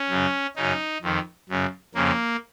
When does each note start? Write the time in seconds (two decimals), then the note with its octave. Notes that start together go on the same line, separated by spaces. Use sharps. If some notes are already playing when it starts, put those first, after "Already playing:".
Already playing: C#4
0.10 F#2 C#3
0.56 F#2 C#3 D#4
1.02 F2 D#3
1.49 F#2 C#3
1.95 F2 C#3 A#3